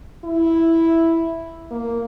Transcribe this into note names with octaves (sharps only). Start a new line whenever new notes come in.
E4
A#3